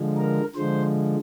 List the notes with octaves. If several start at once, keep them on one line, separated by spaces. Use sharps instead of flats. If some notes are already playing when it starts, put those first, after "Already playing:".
Already playing: D3 F3 G#3
A#4
D3 F3 G#3 C5